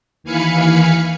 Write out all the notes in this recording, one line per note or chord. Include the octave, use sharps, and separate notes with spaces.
D#2 E3 F5 G#5 B5 C#7